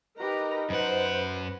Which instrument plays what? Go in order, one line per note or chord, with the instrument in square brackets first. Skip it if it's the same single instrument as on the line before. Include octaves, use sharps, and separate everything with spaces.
[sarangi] D#4 [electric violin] G4 [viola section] A#4 B4 A#5
[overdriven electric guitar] F#2 F#5 [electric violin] B4 [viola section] C5